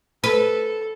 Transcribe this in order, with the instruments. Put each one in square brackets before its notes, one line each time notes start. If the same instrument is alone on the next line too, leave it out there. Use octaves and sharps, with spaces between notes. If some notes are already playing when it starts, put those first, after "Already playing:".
[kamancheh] A4 [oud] B4